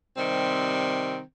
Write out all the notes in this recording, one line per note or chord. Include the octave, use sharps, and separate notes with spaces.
C3 D#3 G3 C4